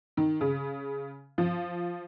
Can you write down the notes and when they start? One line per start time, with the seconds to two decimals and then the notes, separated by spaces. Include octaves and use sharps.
0.17 D#3
0.41 C#3
1.38 F3